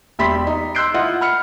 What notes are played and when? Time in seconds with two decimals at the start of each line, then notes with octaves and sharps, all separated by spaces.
0.19 E1 G4 E5 B5 C6 B6
0.47 D#4
0.75 C6 E6 F#6 G6 C7 D7
0.94 E4 F4 D#5 F#5
1.21 B5 F6 C#7